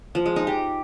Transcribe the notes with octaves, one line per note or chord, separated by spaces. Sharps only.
F3
G#3
D#4
G4